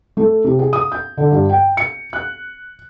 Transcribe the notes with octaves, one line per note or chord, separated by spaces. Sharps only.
A3
C3
G#4
D#6
G6
D3
G2
G5
C#7
F#6